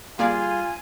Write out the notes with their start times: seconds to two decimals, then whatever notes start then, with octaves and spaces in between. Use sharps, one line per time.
0.19 A#2 G3 A#3 F4 G#4 D5 F5 G#5